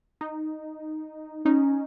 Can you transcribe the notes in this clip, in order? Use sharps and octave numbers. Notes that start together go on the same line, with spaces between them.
D#4
C#4 D#4